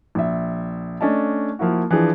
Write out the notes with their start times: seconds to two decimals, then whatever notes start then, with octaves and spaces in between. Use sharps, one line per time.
0.15 A#1 E5
1.01 A3 C#4 D4 D#5 A5
1.59 F3 A#3 E4 F#4
1.90 E3 F3 D4 G#4